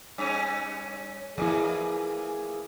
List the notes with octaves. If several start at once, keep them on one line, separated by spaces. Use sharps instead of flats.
G2 C#4
A2 E3 F3 A#3 E4 G#4